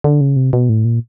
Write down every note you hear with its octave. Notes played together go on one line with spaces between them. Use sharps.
D3
C#3
C3
B2
A2
A#2